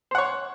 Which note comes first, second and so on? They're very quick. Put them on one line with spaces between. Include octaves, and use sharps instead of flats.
C5 F#5 C#5